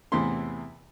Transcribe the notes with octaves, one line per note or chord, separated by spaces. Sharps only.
E2 A2 C3 E3 E4 C6